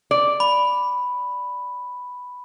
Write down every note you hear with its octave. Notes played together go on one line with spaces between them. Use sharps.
D5
B5